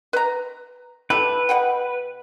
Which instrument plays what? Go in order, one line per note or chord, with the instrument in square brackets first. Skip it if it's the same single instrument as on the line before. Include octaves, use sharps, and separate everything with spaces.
[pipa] B4 A#5
[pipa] E4 G4 A4 [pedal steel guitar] B4
[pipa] B2 F#5 G5